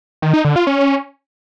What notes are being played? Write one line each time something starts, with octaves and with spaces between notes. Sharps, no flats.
D#3
D#4
D3
F4
C#4